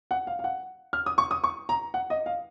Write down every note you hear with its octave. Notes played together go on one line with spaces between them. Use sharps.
F#5
F5
F5
F#5
F6
D#6
C#6
D#6
C#6
A#5
F#5
D#5
F5